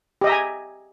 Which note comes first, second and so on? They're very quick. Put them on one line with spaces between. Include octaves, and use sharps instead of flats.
G4 D#5 E5 A#5 G#5